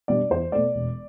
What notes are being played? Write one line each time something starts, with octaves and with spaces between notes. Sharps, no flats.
B2 G3 D4 D5
E2 C5
B2 A3 D5
E1